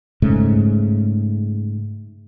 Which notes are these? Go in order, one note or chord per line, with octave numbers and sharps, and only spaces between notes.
G#2 C#3 A3